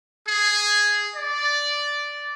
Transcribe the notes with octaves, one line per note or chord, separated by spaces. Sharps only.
G#4
D5